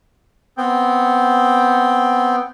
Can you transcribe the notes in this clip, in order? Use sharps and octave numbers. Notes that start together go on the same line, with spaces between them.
B3 C4 G5